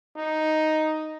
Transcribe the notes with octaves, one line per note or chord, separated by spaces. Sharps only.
D#4